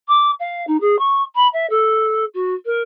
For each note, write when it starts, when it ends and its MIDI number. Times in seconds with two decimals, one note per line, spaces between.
0.08 0.31 86
0.39 0.64 77
0.67 0.79 63
0.80 0.96 68
0.99 1.22 85
1.35 1.47 83
1.53 1.66 76
1.70 2.25 69
2.34 2.54 66
2.65 2.82 70